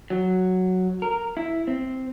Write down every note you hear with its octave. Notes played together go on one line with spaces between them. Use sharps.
F#3
A#4
E4
C4